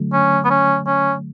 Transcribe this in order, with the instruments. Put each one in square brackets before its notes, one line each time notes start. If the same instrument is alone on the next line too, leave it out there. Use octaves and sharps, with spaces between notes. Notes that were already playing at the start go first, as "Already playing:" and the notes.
Already playing: [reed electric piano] D3 F#3 A3
[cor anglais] C#4
B3
C#4
C#4